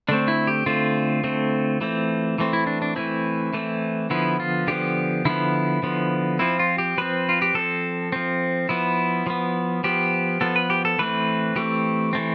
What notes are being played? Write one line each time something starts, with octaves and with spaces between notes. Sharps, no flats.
D3 A3 C4 D4
E4
G4
D3 A3 C4 F4
D3 A3 C4
E3 A3 C4
E3 A3 C4
E4
D4
D4
E3 A3 C4 E4
E3 A3 C4
D3 F3 B3 E4
F4
D3 F3 B3 G4
D3 F3 B3 E4
D3 F3 B3
F3 C4 E4
F4
G4
F3 C4 B4
F4
G4
F3 C4 A4
F3 C4
F3 B3 E4
F3 B3
F3 B3 G4
F3 B3 A4
B4
G4
A4
E3 A3 C4 B4
E3 A3 C4 G4
E3 A3 C4